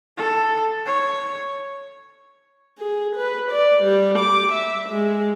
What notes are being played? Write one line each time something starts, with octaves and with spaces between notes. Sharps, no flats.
A4
C#5
G#4
B4
D5
G3
D6
E5
G#3